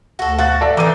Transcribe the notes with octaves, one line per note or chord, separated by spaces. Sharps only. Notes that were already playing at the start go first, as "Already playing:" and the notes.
D2 F#4 A4
F#4 F5 F#6 A6
A4 D5 E5
D#3 E3 C4 A#5 D6 D#7